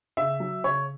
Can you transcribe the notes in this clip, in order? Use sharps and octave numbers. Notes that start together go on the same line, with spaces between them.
C#3 E5
F#3
C#3 C#5